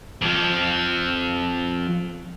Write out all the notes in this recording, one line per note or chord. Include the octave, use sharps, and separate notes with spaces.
F2 F3